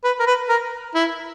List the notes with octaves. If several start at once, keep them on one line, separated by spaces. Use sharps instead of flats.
B4
A#4
B4
A#4
E4